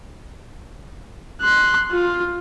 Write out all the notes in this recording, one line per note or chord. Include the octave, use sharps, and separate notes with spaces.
C6 F#6
F4